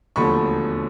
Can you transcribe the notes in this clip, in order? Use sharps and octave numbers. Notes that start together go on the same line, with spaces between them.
E1 D#2 D3 F3 A3 B5 C#6